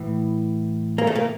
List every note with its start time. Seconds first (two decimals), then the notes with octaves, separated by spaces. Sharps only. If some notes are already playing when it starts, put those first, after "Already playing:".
Already playing: A2 E3
0.98 A#3
1.07 A3
1.15 A#3